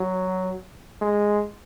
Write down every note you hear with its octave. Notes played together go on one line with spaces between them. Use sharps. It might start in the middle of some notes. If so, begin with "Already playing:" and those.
Already playing: F#3
G#3